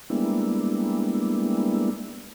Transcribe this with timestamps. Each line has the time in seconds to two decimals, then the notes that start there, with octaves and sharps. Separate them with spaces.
0.10 G3 G#3 A#3 B3 D4 E4